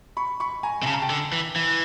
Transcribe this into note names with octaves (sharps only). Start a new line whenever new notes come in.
B5 C#6
B5 C#6
G#5 A#5
C3
C#3 A5
A#5
G5 A5
D3
E3
E3